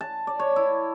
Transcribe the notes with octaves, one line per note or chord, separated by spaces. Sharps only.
A5
D5
C#5
E4